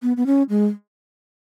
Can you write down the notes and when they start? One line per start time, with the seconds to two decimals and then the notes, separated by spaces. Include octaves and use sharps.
0.02 B3
0.17 B3
0.26 C#4
0.50 G#3